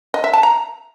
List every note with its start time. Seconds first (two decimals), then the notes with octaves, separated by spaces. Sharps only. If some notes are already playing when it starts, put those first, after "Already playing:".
0.14 D#5
0.24 E5
0.33 A5
0.43 A#5